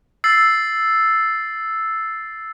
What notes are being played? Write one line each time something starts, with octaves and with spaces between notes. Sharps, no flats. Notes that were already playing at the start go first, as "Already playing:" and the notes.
E6 A6 C7